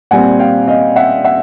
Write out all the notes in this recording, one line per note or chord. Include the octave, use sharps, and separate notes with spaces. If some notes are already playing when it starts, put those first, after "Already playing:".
A#2 G3 C4 F#5 G#5
F5 G5
D#5 F5
E5 F#5
E5 F#5